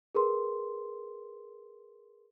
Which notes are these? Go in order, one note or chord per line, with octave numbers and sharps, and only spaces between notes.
G#4 A#4 B4 C6